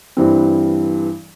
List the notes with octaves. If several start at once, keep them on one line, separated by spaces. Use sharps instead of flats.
G2 E3 C4